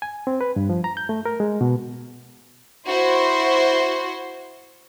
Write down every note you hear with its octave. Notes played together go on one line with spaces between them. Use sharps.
G#5
C4
B4
G2
F3
A#5
G6
A3
A#4
G#3
B2
E4 F#4 C5 C6